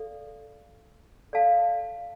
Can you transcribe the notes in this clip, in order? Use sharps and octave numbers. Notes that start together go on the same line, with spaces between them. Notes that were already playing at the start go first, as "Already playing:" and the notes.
Already playing: A4 D5 F5
A4 D5 F5 A5